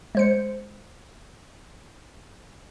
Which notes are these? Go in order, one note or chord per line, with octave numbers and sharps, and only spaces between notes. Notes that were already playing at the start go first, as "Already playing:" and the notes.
G#3 C5 C#7